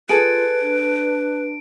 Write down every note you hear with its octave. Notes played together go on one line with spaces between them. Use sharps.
F4 G#4 A4 B4 D7
D4